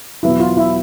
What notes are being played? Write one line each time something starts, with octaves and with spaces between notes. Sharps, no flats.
E2 B2 F#3 B3 E4
F4
E4